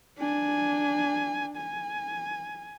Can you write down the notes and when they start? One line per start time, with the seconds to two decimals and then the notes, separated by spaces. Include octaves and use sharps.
0.18 D4 G#5
1.57 G#5